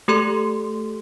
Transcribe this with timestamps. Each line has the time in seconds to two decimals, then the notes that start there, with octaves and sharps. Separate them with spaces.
0.08 A3 G4 A4 C6